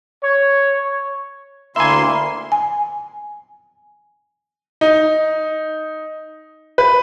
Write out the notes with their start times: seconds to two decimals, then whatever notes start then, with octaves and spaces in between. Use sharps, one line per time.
0.23 C#5
1.76 D2 A#3 E4 E5 G#5 C6
2.52 G#5
4.81 D#4
6.78 B4